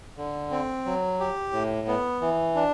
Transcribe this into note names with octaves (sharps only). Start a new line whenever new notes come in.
D3
C4
F#3
G4
A2
B3
E3
D4